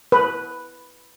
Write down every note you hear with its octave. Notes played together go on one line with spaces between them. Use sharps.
B4